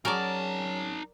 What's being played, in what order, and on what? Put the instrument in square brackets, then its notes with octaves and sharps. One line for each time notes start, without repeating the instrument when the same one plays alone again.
[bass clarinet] F#3 [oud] C#4 F#4 G#4 [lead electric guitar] D#4 A5 [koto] A#4 D5